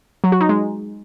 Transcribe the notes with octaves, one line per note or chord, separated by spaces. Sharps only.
F#3
F#4
D#4
G#3